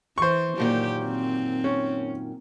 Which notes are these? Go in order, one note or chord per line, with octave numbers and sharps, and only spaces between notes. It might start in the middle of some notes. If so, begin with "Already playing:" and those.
E3 C5 C#6
F#2 A#2 D#3 G4
C4
C#4